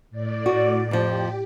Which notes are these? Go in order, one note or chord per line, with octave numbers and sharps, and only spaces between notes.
A2 D5
F#4
F2 F3 G4